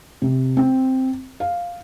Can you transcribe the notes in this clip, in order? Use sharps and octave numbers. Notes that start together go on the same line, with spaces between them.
C3
C4
F5